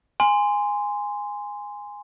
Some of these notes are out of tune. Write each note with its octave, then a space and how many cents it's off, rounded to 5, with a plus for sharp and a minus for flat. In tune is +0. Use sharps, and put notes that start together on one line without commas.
G#5 -10 C6 -10